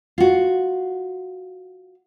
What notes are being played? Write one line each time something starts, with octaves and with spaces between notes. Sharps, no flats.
F4 F#4